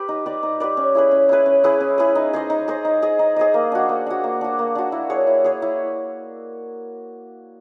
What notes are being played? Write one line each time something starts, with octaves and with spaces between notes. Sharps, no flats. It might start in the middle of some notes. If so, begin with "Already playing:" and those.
Already playing: G4 B4
D#4
G4 B4 D5
D#4
G4 B4 D5
C#4
E4 G#4 B4
C#4
E4 G#4 B4
C#4
E4 G#4 B4
C#4
E4 G#4 B4
D#4
G#4 C5 D#5
D#4
G#4 C5 D#5
D#4
G#4 C5 D#5
D#4
G#4 C5 D#5
A#3
D4 F#4
A#3
D4 F#4
A#3
D4 F#4
A#3
D4 F#4
E4
G#4 C#5
E4
G#4 C#5
E4